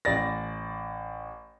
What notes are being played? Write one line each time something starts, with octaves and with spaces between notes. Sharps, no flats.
A1 D5 A6 A#6